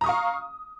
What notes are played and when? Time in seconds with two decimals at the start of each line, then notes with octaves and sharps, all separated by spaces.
0.01 A#5
0.04 D#6
0.06 C#6
0.09 F5